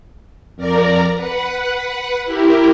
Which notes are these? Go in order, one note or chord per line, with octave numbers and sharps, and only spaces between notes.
F2 A#4 D5 A#5
B4 F#5
E4 G4 A#4